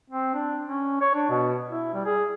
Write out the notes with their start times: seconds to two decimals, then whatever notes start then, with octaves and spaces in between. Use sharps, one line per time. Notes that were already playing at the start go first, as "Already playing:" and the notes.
0.10 C4
0.34 D4
0.67 C#4
1.01 C#5
1.14 D4
1.29 B2
1.70 E4
1.94 G3
2.06 G#4